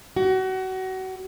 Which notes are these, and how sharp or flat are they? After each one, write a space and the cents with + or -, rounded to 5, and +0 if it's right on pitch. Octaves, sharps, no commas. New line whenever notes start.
F#4 +30